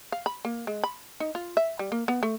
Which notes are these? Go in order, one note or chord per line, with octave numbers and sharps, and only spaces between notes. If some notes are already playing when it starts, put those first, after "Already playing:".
F5
B5
A#3
G#3
B5
D#4
F4
E5
G3
A#3
B3
A3